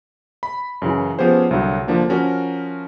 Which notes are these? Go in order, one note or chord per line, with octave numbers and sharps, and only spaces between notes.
B5
F#2 C#3 E3
F3 B3 C#4 G4 G#4 C5
C2 D3 F#3
D3 F3 A#3 D4
F3 C#4 F#4 A#4